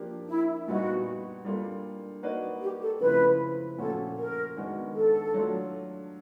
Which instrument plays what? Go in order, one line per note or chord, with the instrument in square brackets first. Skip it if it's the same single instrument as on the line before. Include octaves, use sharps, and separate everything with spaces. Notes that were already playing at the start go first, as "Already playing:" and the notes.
Already playing: [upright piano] F3 A#3 D4 G4
[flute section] E4
[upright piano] A#2 G3 B3 D#4 [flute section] F#4
[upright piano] G3 A#3 D4 F4 A4
A#3 D#4 F#4 B4 D5
[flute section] G4
A4
[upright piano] C#3 F3 A3 C4 E4 [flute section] B4
[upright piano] A#2 F3 A3 C#4 F#4 [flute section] A4
[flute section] A#4
[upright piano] D#3 G#3 B3 D4 F#4
[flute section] A4
[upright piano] F#3 A3 D4 F4